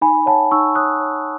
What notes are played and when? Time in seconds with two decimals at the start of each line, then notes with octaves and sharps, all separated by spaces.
0.02 D#4 G#5 B5
0.26 C#5 F#5 A5
0.51 D#4 C#6 E6
0.75 C#5 D#6 F#6
1.00 C#5